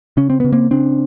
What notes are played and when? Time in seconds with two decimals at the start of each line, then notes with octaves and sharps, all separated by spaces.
0.17 C#3 C#4
0.30 C4
0.40 C#3 B3
0.52 A#3 C4
0.71 C#3 C4 D4